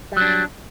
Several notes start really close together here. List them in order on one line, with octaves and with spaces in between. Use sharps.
G3 F#3 D4